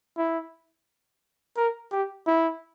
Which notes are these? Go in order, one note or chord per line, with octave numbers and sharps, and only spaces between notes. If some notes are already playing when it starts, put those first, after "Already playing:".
E4
A#4
G4
E4